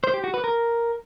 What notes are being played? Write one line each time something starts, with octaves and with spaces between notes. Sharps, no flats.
C5
G4
F#4
B4
A#4